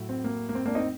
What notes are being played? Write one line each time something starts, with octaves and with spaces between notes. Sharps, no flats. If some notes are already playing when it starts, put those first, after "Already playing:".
Already playing: A2 F#3
C4
A#3
A#3
C4
A#3 D4
C4 D#4